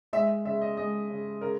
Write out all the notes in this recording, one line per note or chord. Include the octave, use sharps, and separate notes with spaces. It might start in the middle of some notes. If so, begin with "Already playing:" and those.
G#3 E5
C#3 E5
D#5
G#3 D#5
C#3
C#3 A#4